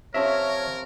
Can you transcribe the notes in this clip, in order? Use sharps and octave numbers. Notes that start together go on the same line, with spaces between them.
C3 F3 C#4 A#4 C#5 E5